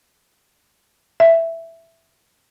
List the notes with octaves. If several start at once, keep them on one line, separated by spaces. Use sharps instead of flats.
E5